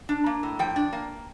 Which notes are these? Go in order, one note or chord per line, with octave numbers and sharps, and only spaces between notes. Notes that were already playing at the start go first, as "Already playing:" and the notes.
D4
A#3
A2
F3 G5
D4
A#3